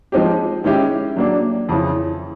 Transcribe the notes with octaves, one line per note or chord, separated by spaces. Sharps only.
F3 G#3 C4 D#4 G4
D#3 G#3 C#4 E4 G4
F#3 A#3 D4
F2 C#3 E3